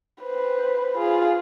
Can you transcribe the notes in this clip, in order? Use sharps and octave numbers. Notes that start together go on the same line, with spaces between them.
B4 C5
F4 G#4